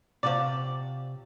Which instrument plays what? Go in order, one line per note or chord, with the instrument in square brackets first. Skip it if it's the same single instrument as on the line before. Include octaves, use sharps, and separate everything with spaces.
[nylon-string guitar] C3 F5 [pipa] F3 F#4 D5